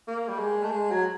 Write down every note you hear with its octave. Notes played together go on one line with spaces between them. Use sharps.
A#3
G3
G#3
A3
G#3
F#3